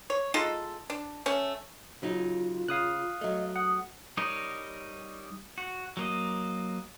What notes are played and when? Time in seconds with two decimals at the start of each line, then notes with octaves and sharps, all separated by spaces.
0.10 C#5
0.34 G#3 D#4 F4 A4
0.90 D4
1.26 A3 C#4
2.02 C#3 F#3 D#4 F4
2.68 C#3 F5 D#6 F#6
3.21 F#3 A3 D#5
3.56 F#5 D#6
4.17 G3 D#4 A#4 C#5 D#5
5.58 F#4
5.97 F#3 A#3 D#5